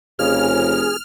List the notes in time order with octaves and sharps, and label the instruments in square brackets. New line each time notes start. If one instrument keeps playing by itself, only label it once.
[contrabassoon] F1 [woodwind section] F2 C#3 [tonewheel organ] G#4 [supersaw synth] F6